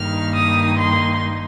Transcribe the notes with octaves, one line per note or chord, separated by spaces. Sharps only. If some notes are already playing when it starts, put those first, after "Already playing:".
Already playing: G2 D#3 A#3 D#4 F6
D#6
C6